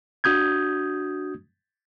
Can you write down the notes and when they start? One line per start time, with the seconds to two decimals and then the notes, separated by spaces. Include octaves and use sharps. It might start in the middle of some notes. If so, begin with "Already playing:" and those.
0.24 D4 F#4 D#6 G6 G#6